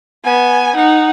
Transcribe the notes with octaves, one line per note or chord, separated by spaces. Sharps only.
B3 G#5
D#4 F#5